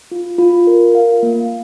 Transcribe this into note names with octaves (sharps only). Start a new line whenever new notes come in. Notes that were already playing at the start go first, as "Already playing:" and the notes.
F4
F4
A#4
F5
A#3